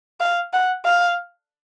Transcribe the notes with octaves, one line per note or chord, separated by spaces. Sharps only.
F5
F#5
F5